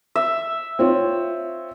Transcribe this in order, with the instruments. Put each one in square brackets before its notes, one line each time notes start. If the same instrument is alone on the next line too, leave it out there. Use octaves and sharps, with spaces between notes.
[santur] E5
[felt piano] C4 F4 C#5